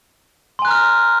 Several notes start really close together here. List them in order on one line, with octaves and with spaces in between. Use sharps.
C6 G#5 F#6 A#5 F6